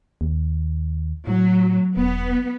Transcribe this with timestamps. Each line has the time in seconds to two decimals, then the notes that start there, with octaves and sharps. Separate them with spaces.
0.21 D#2
1.27 A2 F#3
1.97 E1 B3